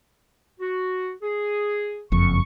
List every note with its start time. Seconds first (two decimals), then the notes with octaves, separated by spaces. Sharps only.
0.60 F#4
1.23 G#4
2.12 F#1 F2 C#6